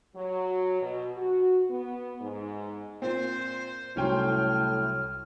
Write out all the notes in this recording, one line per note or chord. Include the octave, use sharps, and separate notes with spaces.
F#3
B2
F#4
B3
G#2
A#2 C4 C5
C2 A2 F#3 C#4 G5 C6 F6